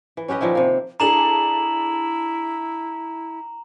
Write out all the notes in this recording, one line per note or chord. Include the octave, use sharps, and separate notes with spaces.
E3
C#4 G4 B4 D#5
A#2 D#3 F3 E4
C3 A#3
D4 E4 G#4 A4 A#5 E7 F#7